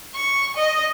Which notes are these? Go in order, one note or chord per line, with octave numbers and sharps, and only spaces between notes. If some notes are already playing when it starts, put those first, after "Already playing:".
C#6
D#5